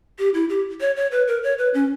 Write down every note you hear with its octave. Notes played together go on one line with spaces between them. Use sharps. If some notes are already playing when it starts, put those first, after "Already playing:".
G4
E4
G4
C#5
C#5
B4
A#4
C#5
B4
C#4